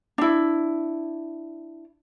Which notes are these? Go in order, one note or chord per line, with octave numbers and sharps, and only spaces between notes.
D4 E4